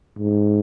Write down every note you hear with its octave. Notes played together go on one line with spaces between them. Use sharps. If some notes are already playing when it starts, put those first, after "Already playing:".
G#2